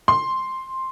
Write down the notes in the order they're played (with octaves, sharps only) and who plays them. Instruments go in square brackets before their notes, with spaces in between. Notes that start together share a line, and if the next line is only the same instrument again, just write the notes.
[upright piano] C6